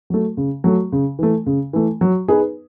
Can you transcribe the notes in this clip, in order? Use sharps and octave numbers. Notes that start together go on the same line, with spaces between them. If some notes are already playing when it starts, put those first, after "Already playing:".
F#3 A3
C#3
F#3 A3
C#3
E3 A3
C#3
E3 A3
F#3
B3 D#4 G#4 B4